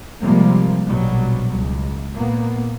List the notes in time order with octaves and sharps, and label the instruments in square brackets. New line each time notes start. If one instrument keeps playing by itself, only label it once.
[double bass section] C3 F3 G3 G#3 A#3
A#1 B2 F#3 G3
C#2
A#2 A#3 B3